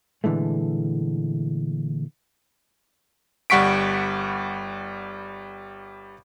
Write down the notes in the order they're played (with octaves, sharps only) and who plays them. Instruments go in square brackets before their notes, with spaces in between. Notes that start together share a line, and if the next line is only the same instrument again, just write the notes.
[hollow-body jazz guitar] A#2 D3 E3 G#3 A3
[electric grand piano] G1 G3 F#5 C#6 B6 D7